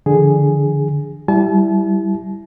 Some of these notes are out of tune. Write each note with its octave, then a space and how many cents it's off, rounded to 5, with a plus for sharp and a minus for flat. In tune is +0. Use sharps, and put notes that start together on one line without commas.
D3 +0 F3 -40 G#4 +0
G3 -10 E4 +0 A5 -40